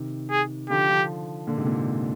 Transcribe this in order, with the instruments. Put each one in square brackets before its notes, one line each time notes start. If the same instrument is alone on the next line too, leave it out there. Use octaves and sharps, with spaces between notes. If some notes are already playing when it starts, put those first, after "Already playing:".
Already playing: [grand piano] C3 D#3
[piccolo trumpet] G#4
[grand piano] D3 F3 [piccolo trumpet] G4
[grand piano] D3 F3
A#2 D3
G#2 C3
A#2